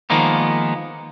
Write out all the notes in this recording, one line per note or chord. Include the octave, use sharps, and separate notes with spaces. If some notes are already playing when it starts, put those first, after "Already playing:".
D#3 F3 G#3 A#3 B3